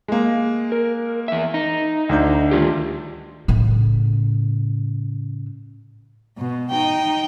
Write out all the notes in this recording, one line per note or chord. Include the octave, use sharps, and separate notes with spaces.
G#3 A#3
A#4
E2 E5
D#4
D2 D4 G6
D#3 F4 G4
A2 C#3
B2
D#4 G5